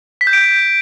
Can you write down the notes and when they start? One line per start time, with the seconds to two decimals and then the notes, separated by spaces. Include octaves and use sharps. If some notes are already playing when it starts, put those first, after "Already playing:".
0.21 B6
0.27 G6
0.33 D7